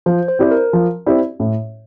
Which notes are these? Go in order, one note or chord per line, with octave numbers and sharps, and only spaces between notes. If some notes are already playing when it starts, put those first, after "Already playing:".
F3 C5
C5
C4 E4 G4 D5
A#4
F3
C4 E4 G4 D5
A2